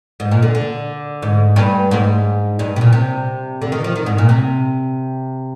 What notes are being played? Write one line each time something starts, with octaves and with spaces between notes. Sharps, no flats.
G#2
A#2
D3
D3
G#2
G2
G#2
G2
C3
A#2
C3
D3
D#3
F3
D#3
G#2
A#2
C3